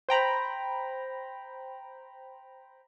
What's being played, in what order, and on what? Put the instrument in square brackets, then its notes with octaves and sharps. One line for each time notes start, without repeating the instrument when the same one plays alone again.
[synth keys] C5 G5 A#5 B5